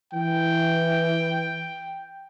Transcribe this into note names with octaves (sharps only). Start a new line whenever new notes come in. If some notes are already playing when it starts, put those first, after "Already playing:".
E3 G5